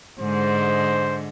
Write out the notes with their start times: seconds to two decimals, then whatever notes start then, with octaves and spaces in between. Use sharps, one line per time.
0.19 G#2 D3 G#3 C5